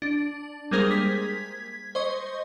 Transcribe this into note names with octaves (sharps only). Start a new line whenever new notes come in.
D4
G3 G#3 A#3 G#4 A#4 C5
G#6 B6
C5 D#5 C#6